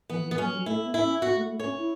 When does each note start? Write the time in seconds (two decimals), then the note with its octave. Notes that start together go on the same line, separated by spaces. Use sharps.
0.09 E3 B3
0.23 E3
0.31 B3
0.38 F#3 C#4
0.52 F#3
0.66 A3 E4
0.85 B3
0.94 E4
1.03 C#4
1.22 B3 F#4
1.36 A3
1.50 A3
1.59 C#4 C#5
1.78 E4